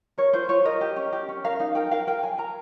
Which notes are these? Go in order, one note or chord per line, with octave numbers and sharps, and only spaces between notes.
A#4 C#5
F4 C5
F4 C#5
A#4 D#5
G4
C#4
G4
C#4
A#4 F5
D#4 F5
A#4 G5
A#4 F5
A#4 G5
A#4 G#5
A#4 A#5